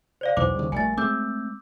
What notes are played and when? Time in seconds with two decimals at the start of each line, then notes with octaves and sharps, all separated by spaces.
0.21 C5 D5 F5
0.37 B1 E2 C5 D6
0.54 D#2 C#3 G3
0.72 A#1 G3 A3 G#5 A6
0.98 G#3 A3 C4 D6 E6 G6